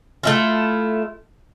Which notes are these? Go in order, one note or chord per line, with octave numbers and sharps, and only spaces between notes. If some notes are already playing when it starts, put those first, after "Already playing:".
A3 E4 F4